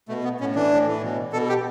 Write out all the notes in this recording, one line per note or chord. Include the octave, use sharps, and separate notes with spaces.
B2 A3
B3
A2 C#4
E3 D4
A2
E3
B2
B2 A4
G4